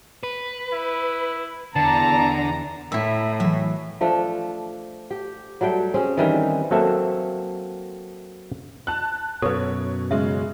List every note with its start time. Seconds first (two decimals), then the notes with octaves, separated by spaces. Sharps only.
0.23 B4
0.73 E4
1.76 E2 D3 A5 A#5
2.92 A2 E4 E5
3.40 E3 F#3 E5
4.01 F3 A3 D4
5.11 G4
5.61 F#3 G3 A3 G5
5.94 C4 C#4 G#4
6.17 D#3 E3 G3
6.71 F#3 A#3 C4 A4 E5
8.87 A5 F#6
9.42 F#2 B2 A4 B4 C#5
10.11 C#3 G#3 E5